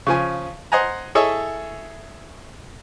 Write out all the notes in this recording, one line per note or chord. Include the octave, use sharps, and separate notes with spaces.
C#3 F3 G#5
C5 D#5 F#5 G#5 A#5
E4 G#4 A4 C#5 D#5 E5